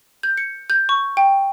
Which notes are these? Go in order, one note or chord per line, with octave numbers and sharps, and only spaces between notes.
G6
C#7
G6
C#6
G5